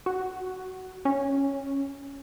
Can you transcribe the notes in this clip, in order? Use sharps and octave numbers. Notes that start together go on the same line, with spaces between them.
F#4
C#4